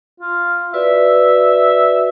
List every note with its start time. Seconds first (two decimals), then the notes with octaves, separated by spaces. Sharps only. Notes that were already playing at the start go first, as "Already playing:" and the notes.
0.20 F4
0.74 F#4 B4 D5 E5